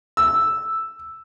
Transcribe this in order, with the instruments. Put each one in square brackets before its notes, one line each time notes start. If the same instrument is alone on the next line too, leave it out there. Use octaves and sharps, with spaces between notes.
[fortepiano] E6